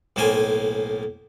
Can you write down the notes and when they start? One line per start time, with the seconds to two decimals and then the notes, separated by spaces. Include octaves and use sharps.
0.16 B1 A2 A#3 C5 G5 G#5